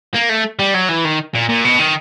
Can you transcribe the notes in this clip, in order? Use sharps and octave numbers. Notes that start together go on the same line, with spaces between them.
A#3
A3
G3
F#3
E3
D#3
A#2
A#2
B2
D#3